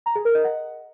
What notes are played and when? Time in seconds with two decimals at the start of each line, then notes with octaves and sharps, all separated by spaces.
0.06 A#5
0.15 G#4
0.25 A#4
0.35 D#5
0.44 F#5